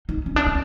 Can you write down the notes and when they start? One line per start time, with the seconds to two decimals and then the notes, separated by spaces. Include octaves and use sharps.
0.09 D#4
0.26 C#4
0.36 D4
0.47 C#4